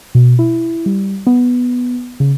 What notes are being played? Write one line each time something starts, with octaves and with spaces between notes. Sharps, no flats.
B2
E4
G3
B3
C#3